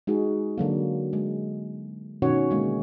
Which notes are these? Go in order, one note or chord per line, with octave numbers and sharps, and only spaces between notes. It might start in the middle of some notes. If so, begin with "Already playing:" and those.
G#3 D#4 F#4 G#4
D3 F#3 A#3
G#3
B2 D#3 C#4 F#4 C#5 F#5
D3 G#3 A#3